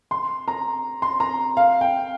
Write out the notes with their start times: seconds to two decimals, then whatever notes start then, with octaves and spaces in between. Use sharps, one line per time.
0.11 C6
0.48 A#5
1.02 C6
1.20 A#5
1.57 F5
1.81 G5